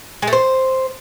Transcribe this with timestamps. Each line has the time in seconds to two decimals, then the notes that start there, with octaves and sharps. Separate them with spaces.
0.22 G#3
0.27 A3
0.33 C5